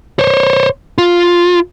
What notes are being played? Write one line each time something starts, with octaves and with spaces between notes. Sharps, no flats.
C5 C#5
F4